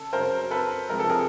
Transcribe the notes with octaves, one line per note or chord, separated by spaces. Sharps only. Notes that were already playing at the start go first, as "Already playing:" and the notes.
Already playing: C#3 A4
C#3 F#3 A#4 C5
A4 B4
C3 F3 G#3 A#4
A4
G#4 A#4